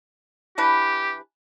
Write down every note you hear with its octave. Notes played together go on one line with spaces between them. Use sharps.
E3 D4 G4 B4